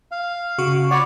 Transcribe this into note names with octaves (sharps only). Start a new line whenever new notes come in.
F5
C#3 F#4 C#6
F#4 C#5 D5 F#5 B5